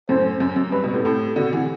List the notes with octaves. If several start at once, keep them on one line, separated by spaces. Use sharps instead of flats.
F#2 A2 C5
F#2
F#2
G2 B4
G2 B2
A2 C3
A2 C3 A4
B2 D3 F#4
C3 E3